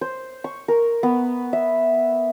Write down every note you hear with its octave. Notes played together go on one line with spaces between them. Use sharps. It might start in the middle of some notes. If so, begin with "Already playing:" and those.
C5
C#6
A#4
B3
E5